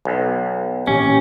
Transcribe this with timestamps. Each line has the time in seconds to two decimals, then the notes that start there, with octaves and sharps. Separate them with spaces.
0.05 B1
0.87 G#1 A#2 E3 C#4 G4